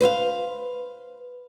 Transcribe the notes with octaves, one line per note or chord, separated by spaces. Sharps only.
B4 C5 E5 F5